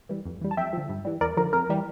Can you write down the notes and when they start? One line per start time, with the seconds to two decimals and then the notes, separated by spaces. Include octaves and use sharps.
0.09 E3 G3
0.25 F2
0.41 E3 G3
0.51 A5
0.57 F2 E5 G5
0.73 D3 F3
0.89 G2
1.05 E3 G3
1.21 E2 A#4 D5
1.37 D3 F3 A#4
1.53 F2 A#4
1.69 E3 G3